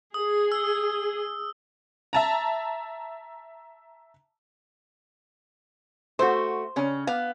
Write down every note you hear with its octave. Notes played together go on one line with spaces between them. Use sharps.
G#4 D#6
E6
E5 A5 A#5
A3 F#4 C5
C#3 C#4
B3 F5